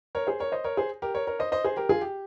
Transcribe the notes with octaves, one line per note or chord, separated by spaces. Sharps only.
A#4 C#5
G#4 C5
A#4 C#5
C5 D#5
A#4 C#5
G#4 C5
G4 A#4
A#4 C#5
A#4 C#5
C5 D#5
C5 D#5
G#4 C5
G4 A#4
F4 G#4
G4